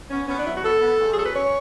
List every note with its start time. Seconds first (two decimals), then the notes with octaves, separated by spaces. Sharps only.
0.10 B3 C#4
0.28 B3 C#4
0.37 D4
0.45 F#3 E4
0.54 F#4
0.63 B3 A4
0.80 B3
0.98 E2
1.11 G#4
1.15 F#3 A4
1.25 B4
1.33 C#4 C#5